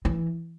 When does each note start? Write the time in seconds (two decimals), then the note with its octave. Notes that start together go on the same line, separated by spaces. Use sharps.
0.05 E3